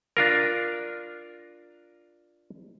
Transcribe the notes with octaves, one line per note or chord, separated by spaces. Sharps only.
D4 F4 A#4